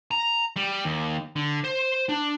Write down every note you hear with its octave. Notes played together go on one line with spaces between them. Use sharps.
A#5
G3
D#2
D3
C5
D4